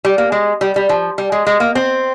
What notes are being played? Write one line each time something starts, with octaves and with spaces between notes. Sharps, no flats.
G3
A#3
G#3
G3
G3
F3
G3
G#3
G#3
A#3
C4